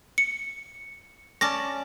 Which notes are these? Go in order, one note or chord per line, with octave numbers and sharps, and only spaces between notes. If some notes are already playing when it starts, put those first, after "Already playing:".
C#7
C#4 D5 A5 A#6